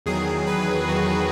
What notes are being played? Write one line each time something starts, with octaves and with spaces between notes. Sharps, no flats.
E2 D#3 F#3 G#4
B4
E2 D#3 F#3 F#4